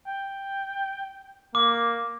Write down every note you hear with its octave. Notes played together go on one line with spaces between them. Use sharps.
G5
A#3 D6